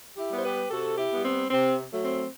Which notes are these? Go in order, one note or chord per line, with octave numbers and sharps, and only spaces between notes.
E4 G4
G3 B3
C5
G4 B4
C3 F#4 A4
E4 G4
G3 B3
C4
C3 C4
F#3 A3
C4